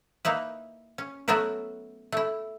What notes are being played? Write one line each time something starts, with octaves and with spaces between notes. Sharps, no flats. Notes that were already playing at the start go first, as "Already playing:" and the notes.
A#3 D#4 E4 B4
C#4
F#3 A3 B3 E4 A#4 B4
A3 E4